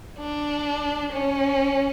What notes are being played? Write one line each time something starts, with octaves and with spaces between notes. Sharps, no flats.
D4
C#4